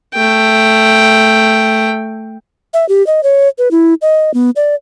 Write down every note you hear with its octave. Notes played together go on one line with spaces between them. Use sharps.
A3 G5
E5
G4
D#5
C#5
B4
E4
D#5
B3
D5